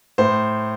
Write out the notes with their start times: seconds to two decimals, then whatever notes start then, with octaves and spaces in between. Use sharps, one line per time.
0.18 A2 C5